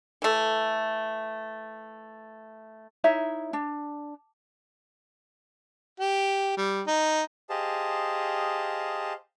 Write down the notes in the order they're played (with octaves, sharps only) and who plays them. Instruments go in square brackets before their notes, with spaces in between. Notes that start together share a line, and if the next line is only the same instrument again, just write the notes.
[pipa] E3 A3
[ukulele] D#4 E4 C#5 E5
D4
[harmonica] G4
G3
D#4
[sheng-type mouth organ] G4 G#4 C5 D#5 F5 A5